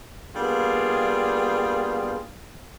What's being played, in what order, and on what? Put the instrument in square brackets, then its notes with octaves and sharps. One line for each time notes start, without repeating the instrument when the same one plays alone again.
[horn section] G3 A#3 B3 D4 F4 G#4